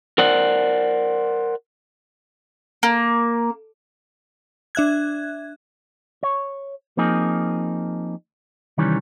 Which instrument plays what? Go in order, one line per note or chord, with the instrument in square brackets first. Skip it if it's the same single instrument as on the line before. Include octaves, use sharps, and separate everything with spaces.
[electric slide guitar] A#4 C5 D5 F#5
[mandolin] A#3
[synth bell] D4 E5 F#6 G#6
[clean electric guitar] C#5
F3 A#3 C4 D#4 G#4
C2 D#3 E3 G3 C#4